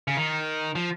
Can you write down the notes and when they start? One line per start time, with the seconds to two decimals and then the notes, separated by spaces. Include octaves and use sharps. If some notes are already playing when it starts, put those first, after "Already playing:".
0.08 C#3
0.17 D#3
0.75 F3